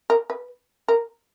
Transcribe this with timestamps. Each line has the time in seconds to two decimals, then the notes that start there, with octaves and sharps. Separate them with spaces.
0.10 A#4
0.30 B4
0.88 A#4